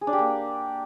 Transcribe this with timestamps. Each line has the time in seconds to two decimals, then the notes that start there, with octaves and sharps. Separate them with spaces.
0.01 G#4
0.07 D4
0.13 G4
0.19 A#3